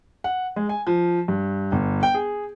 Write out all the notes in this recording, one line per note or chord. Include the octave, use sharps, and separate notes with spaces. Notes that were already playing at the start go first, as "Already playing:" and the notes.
F#5
G#3
G#5
F3
G2
G1
G5
G#4